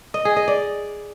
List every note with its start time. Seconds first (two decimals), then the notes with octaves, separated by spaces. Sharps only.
0.14 D#5
0.25 G#4
0.36 D#5
0.48 D5